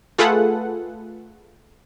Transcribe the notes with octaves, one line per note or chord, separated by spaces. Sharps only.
A3 F4 G#4 A4 B4 F#5